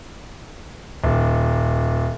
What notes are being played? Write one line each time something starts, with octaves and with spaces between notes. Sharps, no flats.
D#1